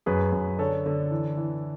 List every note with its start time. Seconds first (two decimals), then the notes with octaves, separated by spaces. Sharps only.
0.06 F#2 G#4 B4
0.32 F#2
0.58 D3 A4 C#5
0.86 D3
1.11 E3
1.37 E3